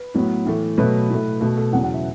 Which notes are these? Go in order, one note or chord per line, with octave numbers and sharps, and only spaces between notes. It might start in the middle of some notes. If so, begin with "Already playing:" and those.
Already playing: B4
A2 F#3 B3
A2 E3 A3
B2 F#3 A3 B4
A2 A3
B2 A3 A4
A4
E2 C#3 F#3 F#5
F#5
E5